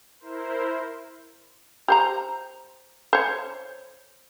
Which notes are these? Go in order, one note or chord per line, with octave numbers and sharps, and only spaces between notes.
E4 A#4 C5
G4 C5 A#5
C5 C#5